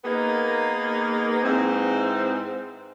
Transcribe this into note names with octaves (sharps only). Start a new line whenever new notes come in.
A#3 B3 D#4 G#4 A#4
G#2 E3 C4